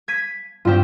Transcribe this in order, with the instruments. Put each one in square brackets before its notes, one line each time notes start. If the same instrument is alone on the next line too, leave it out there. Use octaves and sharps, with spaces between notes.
[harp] G#6 B6 D#7
[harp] G2 C4 [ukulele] F4 G4